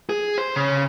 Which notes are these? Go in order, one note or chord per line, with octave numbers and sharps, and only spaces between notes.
G#4
C5
C#3